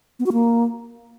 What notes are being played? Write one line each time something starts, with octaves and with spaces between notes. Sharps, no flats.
B3
F#4
A#3